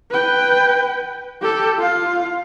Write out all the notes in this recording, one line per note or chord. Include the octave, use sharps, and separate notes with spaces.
B4 G5
G4 A4
F4 F5